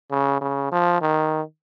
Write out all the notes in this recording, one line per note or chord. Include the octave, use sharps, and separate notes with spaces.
C#3
C#3
F3
D#3